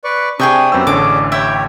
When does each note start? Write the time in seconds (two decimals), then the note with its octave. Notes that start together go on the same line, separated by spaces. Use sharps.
0.04 B4 D5 C#6
0.39 C3 D4 G#4 G5 C#6 D#6
0.72 F#2 B3 C4 G4 E6
0.87 A1 D3 C#4 D4 G#4 C#6 D6
1.32 E4 G4 C#5 E5 G5